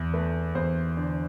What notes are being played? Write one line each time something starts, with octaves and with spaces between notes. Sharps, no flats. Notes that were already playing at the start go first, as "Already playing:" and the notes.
Already playing: E2
A3 B4
E2 C5
D3